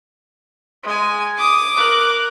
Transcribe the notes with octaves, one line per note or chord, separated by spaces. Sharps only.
G#3 G#5
D6 D#6
A#4 F#6